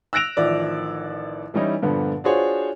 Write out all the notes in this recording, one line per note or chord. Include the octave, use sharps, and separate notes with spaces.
E6 F#6 A#6 D7 F7
A1 D#3 F3 D5 E5
E3 G3 C#4 D#4 E4
G2 A#2 D3 F3 B3
D4 F4 F#4 G#4 C5 C#5